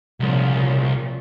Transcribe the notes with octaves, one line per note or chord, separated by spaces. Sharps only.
C2 A#2 C#3 F3